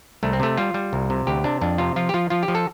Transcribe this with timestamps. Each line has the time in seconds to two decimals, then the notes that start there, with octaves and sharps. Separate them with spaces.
0.23 C2 A3
0.33 C4
0.40 C3 A3
0.57 G3 F4
0.74 G3
0.93 C2
1.10 C3
1.27 D2 G4
1.44 C3 D4
1.61 F2 D4
1.78 C3 F4
1.96 F3 F4
2.09 G4
2.14 F3 F4
2.30 F3 F4
2.43 G4
2.48 F3
2.55 A4